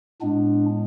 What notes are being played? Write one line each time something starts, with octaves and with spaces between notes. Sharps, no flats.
A2 G#3 B3 D4